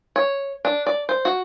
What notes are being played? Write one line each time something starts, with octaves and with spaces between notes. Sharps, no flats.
C#5
D4
D5
C5
F#4